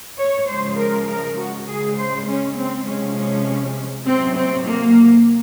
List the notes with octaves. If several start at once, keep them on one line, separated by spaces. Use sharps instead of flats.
C#5
C#3 F3 G#3 C5
A#4
A#4
F#4
C#3 G#3 G#4
C5
C#4
C4
C3 F3 G#3 C#4
C#4
C3 F#3 C4
C4
A#3